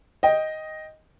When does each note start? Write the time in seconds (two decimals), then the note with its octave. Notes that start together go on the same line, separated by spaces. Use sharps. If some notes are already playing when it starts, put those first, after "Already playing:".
0.23 D#5 G5